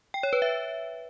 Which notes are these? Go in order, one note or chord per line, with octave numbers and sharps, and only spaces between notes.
G5
C#5
B4
E5